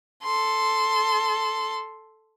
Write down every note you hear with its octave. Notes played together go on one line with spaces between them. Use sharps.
A4 C6